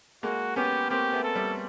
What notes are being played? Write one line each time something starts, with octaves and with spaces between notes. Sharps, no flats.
G#3 A#3 F#4
B3 C#4 G4
A#3 C4 G4
A3 B3
A4
G3 A3